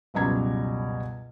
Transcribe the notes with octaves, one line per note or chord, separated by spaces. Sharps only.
C#2 F#2 B2 G3 A#5 G#6